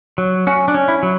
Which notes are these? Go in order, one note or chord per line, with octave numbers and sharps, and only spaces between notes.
F#3
C#4 F#4
D4
C#4
E4
F#3